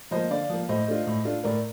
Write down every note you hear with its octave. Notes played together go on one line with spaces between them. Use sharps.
F3 A#3 C5 D#5
D3 D5 F5
F3 A#3
A2 C5 D#5
A3 D4 F4
A2
A3 D4 F4
A2 A#4 D5